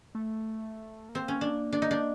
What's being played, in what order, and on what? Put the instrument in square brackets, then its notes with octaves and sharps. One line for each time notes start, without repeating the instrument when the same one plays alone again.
[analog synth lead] A3
A#3
[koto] C4
C#4
D4
D4
D#4
D4